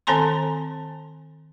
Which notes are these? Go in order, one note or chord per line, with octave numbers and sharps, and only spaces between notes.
D#3 C4 A4 G#5 A#5 C6